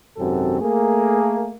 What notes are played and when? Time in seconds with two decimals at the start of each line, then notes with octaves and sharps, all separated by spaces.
0.17 G#1 F#2 C3 C4 F#4 A4
0.61 A3 A#3 G#4